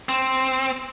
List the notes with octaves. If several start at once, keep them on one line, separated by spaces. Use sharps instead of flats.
C4